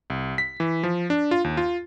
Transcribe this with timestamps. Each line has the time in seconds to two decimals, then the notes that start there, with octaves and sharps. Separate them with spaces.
0.10 C2
0.38 B6
0.60 E3
0.83 F3
1.10 D4
1.31 F4
1.44 D#2
1.57 F4